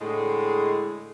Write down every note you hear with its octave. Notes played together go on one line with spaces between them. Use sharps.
A2 D3 G#3